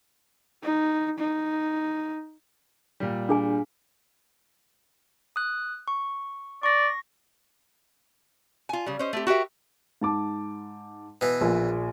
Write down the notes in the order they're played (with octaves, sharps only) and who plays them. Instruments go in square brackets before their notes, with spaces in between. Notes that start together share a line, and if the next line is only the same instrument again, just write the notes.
[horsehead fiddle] D#4
D#4
[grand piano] A#2 G3
[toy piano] D4 G#4 G#5
[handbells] D#6 F#6
C#6
[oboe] D5 [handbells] C#6 A#6
[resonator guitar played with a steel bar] F4 G#5
C#3 G3
C#4 C5 D#5
A3 C4 G4
F#4 G4 A#4 E5
[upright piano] G#2 A5 D6
[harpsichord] B2 E3
[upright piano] A#1 A#2